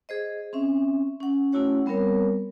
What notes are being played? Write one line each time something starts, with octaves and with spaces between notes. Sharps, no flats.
G#4 C5 D#5
C4 C#4 E5
C#4 F#5
A3 C#4 E4 F#4 C#5 F#5
G3 B3 C4 A#4 C#5